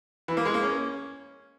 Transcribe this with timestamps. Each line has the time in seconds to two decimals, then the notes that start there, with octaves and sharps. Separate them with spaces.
0.28 E3
0.37 A#3
0.46 G#3
0.54 A#3
0.63 C#4